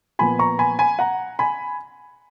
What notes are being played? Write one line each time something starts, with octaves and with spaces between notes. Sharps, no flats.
A#2 F3 B3 G#5 B5
A#5 C#6
G#5 B5
G#5 B5
F#5 A#5
G#5 B5